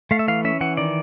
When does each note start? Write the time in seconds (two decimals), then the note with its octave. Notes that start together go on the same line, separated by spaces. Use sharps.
0.11 A3 F5
0.19 E5
0.28 E3 F5
0.44 C#4 E5
0.61 E3 F#5
0.77 D#3 D5